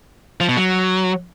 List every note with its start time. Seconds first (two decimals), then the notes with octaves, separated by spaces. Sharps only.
0.40 F3
0.49 B2
0.57 F#3